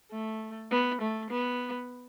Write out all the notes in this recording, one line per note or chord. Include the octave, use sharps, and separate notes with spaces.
A3
B3
A3
B3